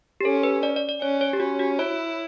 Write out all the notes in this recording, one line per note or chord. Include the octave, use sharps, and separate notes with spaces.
G4
C#4 A4
B4
D5
D5
D5
C#4 C#5
C#5
G4
C#4 F#4
F#4
E4 C#5